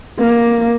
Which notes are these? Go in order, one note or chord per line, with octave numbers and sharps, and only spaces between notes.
A#3